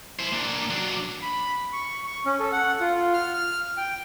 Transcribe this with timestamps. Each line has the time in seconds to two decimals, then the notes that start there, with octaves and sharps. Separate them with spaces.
0.19 E4 C5
0.32 A#3 D4
0.70 F#3 D4
1.22 B5
1.73 C#6
2.07 C#6
2.26 C#4
2.40 A4
2.52 F#5
2.80 F4
3.14 F6
3.34 F6
3.77 G5